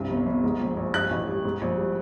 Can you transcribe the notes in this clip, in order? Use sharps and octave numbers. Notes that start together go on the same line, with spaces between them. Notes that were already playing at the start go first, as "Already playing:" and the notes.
Already playing: C2 G2
G1
G1
G#2
A#1
A#1
G2 F#6
A1
G3
G#2
A#1
G3